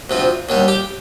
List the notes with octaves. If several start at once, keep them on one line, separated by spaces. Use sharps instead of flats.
D2 C3 F3
D#2 D3 G3
G4